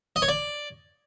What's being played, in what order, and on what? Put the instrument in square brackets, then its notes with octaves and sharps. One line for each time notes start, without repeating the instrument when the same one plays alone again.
[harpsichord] D#5
C#5
D5